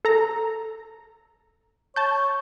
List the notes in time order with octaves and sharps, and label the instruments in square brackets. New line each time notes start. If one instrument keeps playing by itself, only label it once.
[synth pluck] A4 A#5
[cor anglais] C#5 [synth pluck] A5 G6